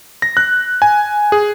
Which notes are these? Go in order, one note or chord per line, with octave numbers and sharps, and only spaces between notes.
A#6
F#6
G#5
G#4